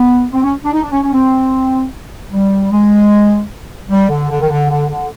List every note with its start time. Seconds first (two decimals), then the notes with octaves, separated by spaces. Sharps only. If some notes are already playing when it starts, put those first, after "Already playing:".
Already playing: B3
0.33 C4
0.43 C#4
0.63 D4
0.73 D#4
0.83 D4
0.92 C#4
1.03 C#4
1.12 C4
2.32 G3
2.71 G#3
3.90 G3
4.09 D3
4.30 D3
4.41 D#3
4.49 D3
4.69 D3
4.89 D3